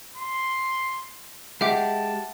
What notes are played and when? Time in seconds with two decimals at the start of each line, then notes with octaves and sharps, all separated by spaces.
0.16 C6
1.61 G#3 G4 E5 F#5 A5 D6